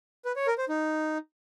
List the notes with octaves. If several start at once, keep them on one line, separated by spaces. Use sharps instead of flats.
B4
C#5
A#4
C5
D#4